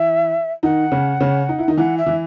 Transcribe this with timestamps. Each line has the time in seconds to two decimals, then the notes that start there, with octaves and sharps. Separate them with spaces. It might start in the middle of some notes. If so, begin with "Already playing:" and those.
Already playing: E3 E4 E5
0.63 D#3 D#4 F#5
0.92 C#3 C#4
1.20 C#3 C#4
1.49 D#4
1.59 E4
1.68 D#3 D#4
1.77 E3 E4 F#5
1.97 E5
2.06 E3 E4